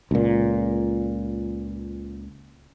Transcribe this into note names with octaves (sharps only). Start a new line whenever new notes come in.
C#2 A#2